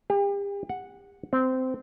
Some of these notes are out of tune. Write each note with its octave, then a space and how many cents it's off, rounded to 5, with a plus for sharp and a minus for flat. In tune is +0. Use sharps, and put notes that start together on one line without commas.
G4 +40
F#5 -5
C4 -15